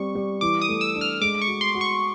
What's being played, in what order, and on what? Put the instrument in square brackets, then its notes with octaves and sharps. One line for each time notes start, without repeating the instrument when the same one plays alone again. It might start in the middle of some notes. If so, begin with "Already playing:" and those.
Already playing: [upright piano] G3 C4 [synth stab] C#6
[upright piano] G3
[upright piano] E3 [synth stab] D6
[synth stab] D#6
[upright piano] A3
[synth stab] E6
[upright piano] D4
[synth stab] F6
[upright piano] G#3 [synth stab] D6
[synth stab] C#6
[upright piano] F#4
[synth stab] C6
[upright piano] F#4
[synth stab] C#6